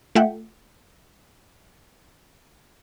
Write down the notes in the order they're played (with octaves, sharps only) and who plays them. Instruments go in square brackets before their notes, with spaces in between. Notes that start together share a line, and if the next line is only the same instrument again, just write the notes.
[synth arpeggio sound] A3 F4 E5 F#5 G5